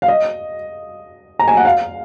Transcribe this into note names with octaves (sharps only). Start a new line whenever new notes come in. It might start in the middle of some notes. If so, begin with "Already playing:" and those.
F5
D#5
A#5
G#5
F#5
F5